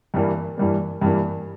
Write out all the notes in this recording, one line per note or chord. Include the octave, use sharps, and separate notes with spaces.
G2 E3 G3 A#3
G2 E3 G3 A#3
G2 E3 G3 A#3